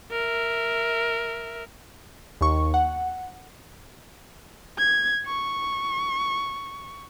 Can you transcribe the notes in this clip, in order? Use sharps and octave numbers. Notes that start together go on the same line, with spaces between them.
A#4 E5
D#2 C#6
F#5
G#6
C#6